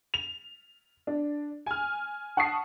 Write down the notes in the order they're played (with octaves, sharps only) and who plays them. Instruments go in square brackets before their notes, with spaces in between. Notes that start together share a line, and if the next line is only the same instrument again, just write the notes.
[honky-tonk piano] F7
D4
G#5 F6
F#5 A5 C#6 D#6 C7